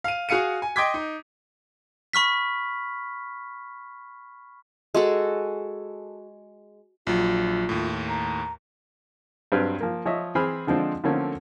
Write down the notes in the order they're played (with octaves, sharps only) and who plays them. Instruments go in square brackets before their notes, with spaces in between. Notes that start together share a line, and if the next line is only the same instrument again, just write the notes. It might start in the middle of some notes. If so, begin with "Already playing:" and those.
[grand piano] F5 D#7
F#4 G#4 F5 C#7 D#7
G#5
D#5 G5 C6 D6 G#6 B6
D#4
[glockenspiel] B5 C#6 F6 B6
[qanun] G#3 F#4 A4
[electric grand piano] A#1 F#3 [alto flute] F4
[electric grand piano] D#2 A2
[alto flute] A#5
[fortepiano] G2 F#3 C4 D4 B4 F6
F3 A#3
F3 C#5 D#5 E5
E3 C4 G#4 C5 B5 F6
D3 F3 G#3 C4 D4
D3 F3 A3 A#3 C4 C#4